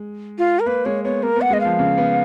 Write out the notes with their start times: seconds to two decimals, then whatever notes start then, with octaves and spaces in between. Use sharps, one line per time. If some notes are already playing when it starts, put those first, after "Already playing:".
Already playing: G#3
0.38 F4
0.60 A#4
0.66 A#3 B4
0.85 G#3 C#5
1.04 B3 C#5
1.23 A#3 A#4
1.36 B3
1.41 F#5
1.51 G#3 D#5
1.60 F3 F5
1.79 C#3
1.98 B3